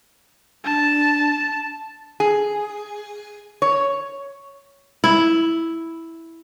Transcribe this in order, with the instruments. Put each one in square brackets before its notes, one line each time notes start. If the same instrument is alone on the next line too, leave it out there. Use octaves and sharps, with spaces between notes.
[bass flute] D4 [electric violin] A5
[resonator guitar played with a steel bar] G#4
C#5
[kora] E4